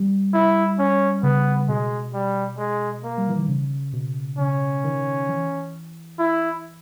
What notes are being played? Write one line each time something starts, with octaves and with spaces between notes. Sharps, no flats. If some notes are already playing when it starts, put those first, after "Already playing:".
Already playing: G3
E4
C#4
C#3 B3
B2 G#3
G3
G#3
A#3
G3
E3
D#3
C#3
B2
C#3 C#4
D#3
E3
E4